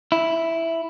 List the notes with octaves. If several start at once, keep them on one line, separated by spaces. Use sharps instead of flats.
E4